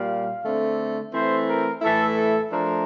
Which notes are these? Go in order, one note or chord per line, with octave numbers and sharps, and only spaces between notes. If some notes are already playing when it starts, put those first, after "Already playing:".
Already playing: A#2 G3 A#3 F5
D3 A3 C4
E3 A3 C4 E4 C5
A#4
A2 E3 A3 E4 A4
A4
F3 A3 D4 A#4